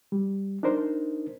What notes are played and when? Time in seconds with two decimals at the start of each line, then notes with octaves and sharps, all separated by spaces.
0.12 G3
0.63 D4 D#4 A#4 C5